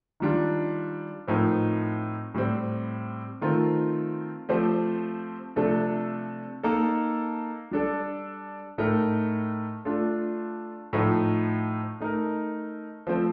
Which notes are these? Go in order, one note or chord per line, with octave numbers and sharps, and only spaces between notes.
D#3 G3 D4 F4
A2 F3 C4 D#4 A#4
A2 G3 C4
D#3 A3 C4 F4 A#4
F3 A3 C4 G4 C5
C3 F3 A3 D4 A4
A#3 D#4 A4
G3 D4 A4 D5
A2 A3 D#4 A#4
A3 D4 F4 A4
A2 F3 A3 D#4
A3 D#4 A#4
F3 A3 C4